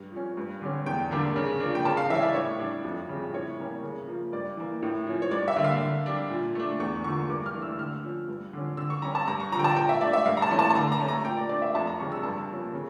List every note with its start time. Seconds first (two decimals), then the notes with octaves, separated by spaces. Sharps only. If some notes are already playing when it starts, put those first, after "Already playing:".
Already playing: G2
0.12 F3 C#4
0.37 G2
0.62 D3 G3 C#4
0.86 E2 G5
1.11 D3 G3 A#3 D4
1.36 C#3
1.60 F3 A#3 D4
1.75 G5
1.85 C#3 A5
1.97 F5
2.10 E3 G3 C#4 E5
2.23 D5
2.35 A2 C#5
2.59 G3 D4
2.84 F2
3.09 C#3 G3
3.34 A2 C#5
3.59 G3 A#3 C#4
3.83 C#3
4.07 F3 A#3
4.33 G2 D5
4.57 E3 A#3
4.83 A2
5.07 F3 C#4
5.22 C#5
5.31 G2 D5
5.48 E5
5.56 D3 G3 A#3
5.64 F5
5.81 D3
6.06 G3 D4
6.30 A#2
6.55 A3 D4
6.80 E2 C#6
7.04 D3 F3 A#3 C#6
7.29 G2 D6
7.46 F6
7.54 E3 A3 D4
7.62 E6
7.78 D3 F6
8.03 F3 C#4
8.29 G2
8.53 D3 F3 C#4
8.77 D3 E6
8.90 C#6
9.02 G3 C#4 A#5
9.15 A5
9.27 G2 A#5
9.40 C#6
9.52 F3 A#5
9.55 D3 G5
9.64 A5
9.76 A#2 G5
9.89 E5
10.01 A3 D4 D5
10.13 E5
10.26 G2 F5
10.37 A#5
10.42 A5
10.51 E3 A3 C#4
10.59 A5
10.70 A5
10.76 D3 A#5
10.92 A#5
11.00 A3 C#4
11.08 A#5
11.25 A#2 G5
11.37 D5
11.49 A3 D4 D5
11.62 E5
11.75 F2 A5
11.87 A#5
11.99 C#3 G3 D4 C#6
12.12 E6
12.23 G2 A5
12.49 F3 A#3 C#4
12.73 C#3